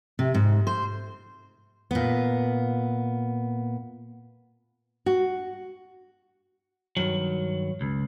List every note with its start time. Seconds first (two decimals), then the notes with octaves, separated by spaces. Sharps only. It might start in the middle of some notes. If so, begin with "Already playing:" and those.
0.19 C3
0.34 G#2
0.67 C5
1.91 A#2 B3
5.06 F#4
6.97 G2 D#3 F#3
7.81 C#2